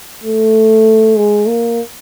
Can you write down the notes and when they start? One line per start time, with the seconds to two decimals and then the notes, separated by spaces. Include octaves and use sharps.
0.24 A3
1.17 G#3
1.48 A#3